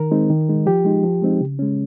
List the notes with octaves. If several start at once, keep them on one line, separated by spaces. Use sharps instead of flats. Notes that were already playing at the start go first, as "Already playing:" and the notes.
Already playing: D#3 A#4
G#3 C4 D#4
D#3
G#3 D#4
F3 G4
G#3 D#4
F3
G#3 C4 D#4
C#3
G#3 C#4